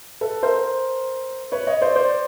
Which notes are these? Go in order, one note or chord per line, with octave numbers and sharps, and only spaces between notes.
A4 B4
A#4 C5
B4 C#5
C#5 D#5
C5 D5
C5 D5